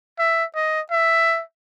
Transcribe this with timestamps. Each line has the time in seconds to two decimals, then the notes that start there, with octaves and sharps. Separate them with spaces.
0.19 E5
0.55 D#5
0.91 E5